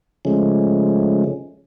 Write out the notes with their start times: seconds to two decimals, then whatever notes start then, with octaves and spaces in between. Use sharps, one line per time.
0.25 C#3 F3 G#3 A3 C#4